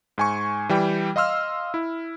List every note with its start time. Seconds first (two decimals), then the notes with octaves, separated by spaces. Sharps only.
0.18 G#2 G#5 C#6
0.69 E3 G3 G5
1.16 D#5 F5 C6 E6 F6
1.74 E4